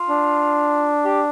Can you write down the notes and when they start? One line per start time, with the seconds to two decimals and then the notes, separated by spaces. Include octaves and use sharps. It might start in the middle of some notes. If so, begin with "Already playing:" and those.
Already playing: F4
0.09 D4
1.05 G4